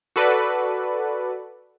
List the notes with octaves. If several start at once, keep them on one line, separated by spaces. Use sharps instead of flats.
F#4 A4 B4 D5